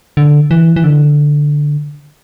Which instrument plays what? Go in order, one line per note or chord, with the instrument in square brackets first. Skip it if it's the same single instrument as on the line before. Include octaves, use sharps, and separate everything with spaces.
[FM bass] D3
E3
E3
D3